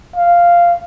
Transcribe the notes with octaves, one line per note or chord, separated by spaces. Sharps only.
F5